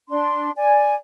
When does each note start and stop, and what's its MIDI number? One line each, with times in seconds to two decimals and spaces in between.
0.09 0.50 62
0.09 0.50 84
0.56 0.94 74
0.56 0.94 80